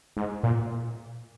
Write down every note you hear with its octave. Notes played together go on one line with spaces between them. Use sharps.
G#2
A#2